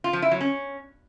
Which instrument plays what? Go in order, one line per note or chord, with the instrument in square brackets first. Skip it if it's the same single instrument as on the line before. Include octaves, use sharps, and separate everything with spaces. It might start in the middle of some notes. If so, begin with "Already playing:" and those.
[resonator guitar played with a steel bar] F4
F3
E4
F#3
C#4